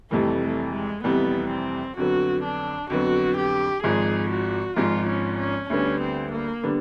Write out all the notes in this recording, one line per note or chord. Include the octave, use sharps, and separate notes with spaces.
F1 F2 C3 E3 G3 A3
A3
G#3
F1 F2 C3 E3 G3 B3
C4
F2 D3 F#3 B3 F#4
D4
F2 D3 F#3 B3 F#4
G4
G#1 G#2 F3 G#3 G#4
F#4
G#1 G#2 F3 G#3 F4
C#4
C#4
D2 D3 G3 B3 C#4 D4
C4
A#3
D3 G3 B3 D4